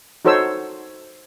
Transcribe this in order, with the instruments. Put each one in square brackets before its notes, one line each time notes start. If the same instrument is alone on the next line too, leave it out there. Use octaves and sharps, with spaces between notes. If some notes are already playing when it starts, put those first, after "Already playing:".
[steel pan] D#4 F#4 A4 C5 C#5 E6